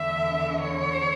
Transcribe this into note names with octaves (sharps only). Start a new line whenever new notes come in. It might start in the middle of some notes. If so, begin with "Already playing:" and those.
Already playing: E2 D3 E5
C#5